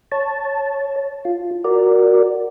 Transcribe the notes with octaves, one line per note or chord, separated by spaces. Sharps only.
C#5 A5
F4
F#4 A#4 D5